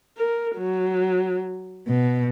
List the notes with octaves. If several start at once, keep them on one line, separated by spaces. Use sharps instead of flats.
A#4
F#3
B2